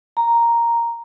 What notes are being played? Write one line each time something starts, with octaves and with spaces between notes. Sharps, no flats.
A#5